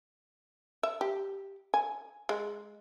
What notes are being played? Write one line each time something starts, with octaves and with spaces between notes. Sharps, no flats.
E5
G4
G#5
G#3